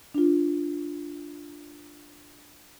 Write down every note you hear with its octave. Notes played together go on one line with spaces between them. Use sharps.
D4 F4